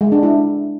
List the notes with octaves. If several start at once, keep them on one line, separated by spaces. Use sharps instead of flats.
G#3
D4
E4